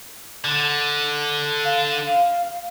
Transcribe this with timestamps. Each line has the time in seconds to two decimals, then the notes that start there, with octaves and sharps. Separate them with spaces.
0.44 D3
1.65 F5